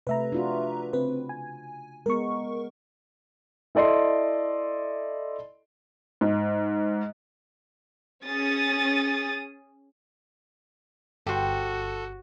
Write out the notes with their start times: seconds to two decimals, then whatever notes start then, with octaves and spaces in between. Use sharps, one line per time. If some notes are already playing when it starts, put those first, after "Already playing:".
0.07 C3 A3 B4 E5 A#5
0.32 D4 F4 F#4
0.93 C#3 C4 B4
1.29 G#5
2.06 G#3 B3 A#4 C#6
3.75 E4 A4 D5 D#5 C6
6.21 G#2
8.26 C#4 G#4 D#6 A6
11.27 G1 F#4 G4 A4 C5